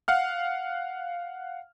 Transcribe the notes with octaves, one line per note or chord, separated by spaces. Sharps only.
F5 F#5 F6